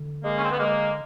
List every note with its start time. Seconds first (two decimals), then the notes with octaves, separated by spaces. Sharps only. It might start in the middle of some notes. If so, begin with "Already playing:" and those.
Already playing: D3
0.23 G#3 A#3
0.36 C#4
0.43 C4
0.51 B3
0.59 G#3 A#3